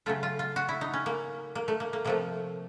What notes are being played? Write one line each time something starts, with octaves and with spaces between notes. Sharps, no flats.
C#3 F#3 A3 F4
F4
F4
F#4
E4
D#4
C#4
A#3
A#3
A3
A#3
A#3
C3 F3 A3 A#3